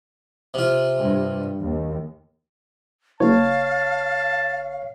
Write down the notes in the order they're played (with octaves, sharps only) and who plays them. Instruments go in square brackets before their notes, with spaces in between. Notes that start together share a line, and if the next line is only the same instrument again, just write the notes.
[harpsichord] C3 F4
[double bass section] G2
D#2
[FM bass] F#1 [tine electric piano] C#5 [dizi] F5 [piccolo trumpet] A5